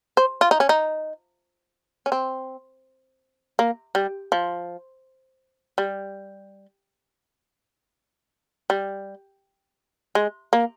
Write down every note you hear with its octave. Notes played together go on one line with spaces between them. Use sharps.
C5
F4
D#4
C#4
D#4
C#4
C4
A#3
G3
F3
G3
G3
G#3
A#3